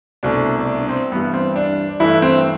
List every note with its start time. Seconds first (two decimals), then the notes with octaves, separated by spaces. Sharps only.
0.23 C2 B2 A3 D4
0.67 D4
0.89 C4
1.12 G2 E3 G3 B3
1.34 C4
1.56 D4
2.00 G2 E3 A3 E4
2.22 C4